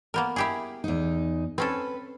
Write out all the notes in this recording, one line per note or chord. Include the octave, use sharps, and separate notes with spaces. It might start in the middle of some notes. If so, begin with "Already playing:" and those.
A#3 B3 A#4
E4 G4 G#4
E2 D#4
C4 C#4 A4 B4